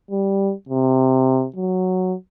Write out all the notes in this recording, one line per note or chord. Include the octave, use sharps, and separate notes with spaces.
G3
C3
F#3